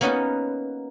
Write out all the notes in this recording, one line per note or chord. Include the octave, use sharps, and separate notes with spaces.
A#3 B3 C#4 D#4 F#4 B4